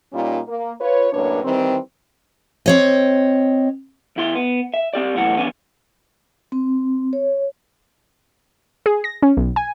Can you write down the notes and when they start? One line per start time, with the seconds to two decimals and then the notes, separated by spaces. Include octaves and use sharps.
0.13 A#2 G3 A#3 C#4 D#4 F4
0.47 A#3
0.80 F4 B4 C#5
1.13 F#2 A2 A#3 D4 B4 C#5
1.43 D#3 E3 G3 C4
2.66 C4 C#5 D#5
4.16 E2 E4 C6
4.35 B3
4.74 E5
4.94 C4 G4 D5
5.16 B1 A2 E3 F#5
5.35 D3 E3 B3 C#4 D4
6.52 C4
7.13 C#5
8.86 G#4
9.04 A#6
9.23 C#4
9.37 B1
9.56 G#5